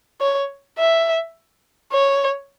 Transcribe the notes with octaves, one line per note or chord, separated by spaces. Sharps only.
C#5
E5
C#5